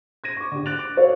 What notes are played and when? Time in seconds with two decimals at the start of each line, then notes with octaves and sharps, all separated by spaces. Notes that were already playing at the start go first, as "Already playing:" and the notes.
0.24 G#6 A#6 D#7
0.37 C#6 D6
0.52 D3 G4
0.66 F#6 A6 D7 F7
0.79 D6 D7
0.97 F#4 A4 A#4 C#5 D5 F5